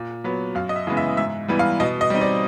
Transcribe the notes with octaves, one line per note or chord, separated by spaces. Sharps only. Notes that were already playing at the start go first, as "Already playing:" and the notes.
Already playing: A#2
F#3 B3
F#2 F5
D#5
E5
C#3 E3 G#3 B3
E5
G#2 E5
E3 G3 B3
F5
B2 D#5
D#5
G3 C4 D#4
D5